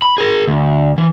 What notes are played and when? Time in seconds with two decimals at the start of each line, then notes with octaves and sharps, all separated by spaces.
0.02 B5
0.18 G#4 A#4
0.47 D2
0.98 E3